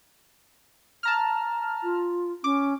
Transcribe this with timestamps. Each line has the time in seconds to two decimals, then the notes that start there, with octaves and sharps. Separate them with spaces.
1.03 A5 A#5 F6
1.83 F4
2.44 C#4 D6